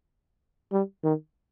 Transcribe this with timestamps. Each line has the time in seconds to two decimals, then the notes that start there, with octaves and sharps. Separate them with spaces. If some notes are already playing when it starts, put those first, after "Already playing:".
0.72 G3
1.04 D#3